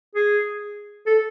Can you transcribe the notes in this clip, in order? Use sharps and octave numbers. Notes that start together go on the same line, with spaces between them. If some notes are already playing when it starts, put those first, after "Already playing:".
G#4
A4